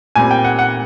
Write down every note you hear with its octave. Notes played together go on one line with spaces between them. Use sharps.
A#2 G3 C4 G#5
G5
F#5
F#5